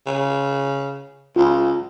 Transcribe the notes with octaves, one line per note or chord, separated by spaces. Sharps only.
C#3
C#2 F4